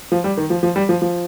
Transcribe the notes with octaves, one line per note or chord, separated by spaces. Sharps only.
F3
G3
D#3
F3
F3
G3
F3
F3